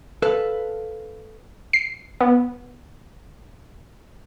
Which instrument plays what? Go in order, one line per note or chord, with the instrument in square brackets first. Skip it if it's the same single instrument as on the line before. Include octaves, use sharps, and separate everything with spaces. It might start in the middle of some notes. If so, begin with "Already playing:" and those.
[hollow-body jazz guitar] A4 B4 F5
[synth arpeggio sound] C7
B3